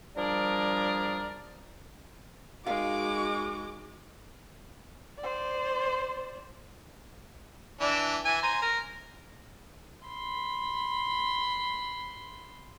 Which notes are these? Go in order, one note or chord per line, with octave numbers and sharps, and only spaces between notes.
F3 G3 D4 G#4 A#4 D5
G#3 D#4 F#4 A#4 F5 D6
C5 D5
E3 D4 D5
E3 G#5
C5 G#5 A#5
A#4 A#5
B5 C6